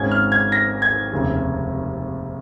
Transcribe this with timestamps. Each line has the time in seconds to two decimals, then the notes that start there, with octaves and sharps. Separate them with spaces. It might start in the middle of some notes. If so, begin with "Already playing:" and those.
Already playing: G#1 G#2 G#3 C#4 G#6
0.11 F6
0.32 G#6
0.52 A#6
0.82 G#6
1.12 F1 D#2 C#3